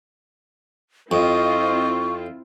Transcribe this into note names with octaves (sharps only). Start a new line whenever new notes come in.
F2 C4 E4 F4 D#5 C#6